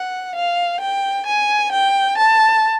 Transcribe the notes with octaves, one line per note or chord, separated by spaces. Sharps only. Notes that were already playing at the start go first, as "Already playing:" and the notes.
Already playing: F#5
F5
G5
G#5
G5
A5